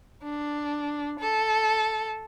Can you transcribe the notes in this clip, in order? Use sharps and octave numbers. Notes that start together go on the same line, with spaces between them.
D4
A4